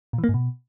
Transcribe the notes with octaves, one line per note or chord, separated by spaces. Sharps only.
A#2
E3
A#3
G#2
B2